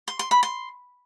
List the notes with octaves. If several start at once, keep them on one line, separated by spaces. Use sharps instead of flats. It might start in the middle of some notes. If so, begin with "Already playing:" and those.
C6
C6
B5
C6